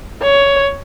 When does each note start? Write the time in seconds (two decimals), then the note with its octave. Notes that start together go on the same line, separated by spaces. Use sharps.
0.22 C#5